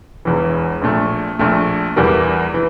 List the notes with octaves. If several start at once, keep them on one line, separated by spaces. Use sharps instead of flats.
E1 E2 E3
A#1 A#2 A3
A#1 A#2 A3
E2 E3 G3 A#3
E3